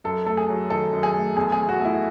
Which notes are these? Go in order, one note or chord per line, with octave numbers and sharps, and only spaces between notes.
F#2 A4
A3 A4
G#4
F#3
D#3 A4
F#2
G#4
A3
E2 G#4
G#4
E2
F#4
A3
E4